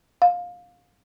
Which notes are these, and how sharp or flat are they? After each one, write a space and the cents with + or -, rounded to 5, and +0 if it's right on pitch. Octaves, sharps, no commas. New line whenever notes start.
F5 +20